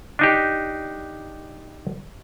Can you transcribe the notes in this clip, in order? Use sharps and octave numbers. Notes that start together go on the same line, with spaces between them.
D4 D#4 G4